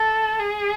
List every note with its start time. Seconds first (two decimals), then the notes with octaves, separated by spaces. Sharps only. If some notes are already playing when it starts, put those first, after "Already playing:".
Already playing: A4
0.40 G#4